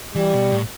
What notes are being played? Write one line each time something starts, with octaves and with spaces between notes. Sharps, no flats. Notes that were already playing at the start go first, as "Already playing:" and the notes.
E3 G3
B2
A2